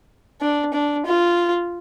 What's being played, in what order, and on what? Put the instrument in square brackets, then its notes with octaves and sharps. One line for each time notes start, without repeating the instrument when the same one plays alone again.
[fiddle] D4
D4
F4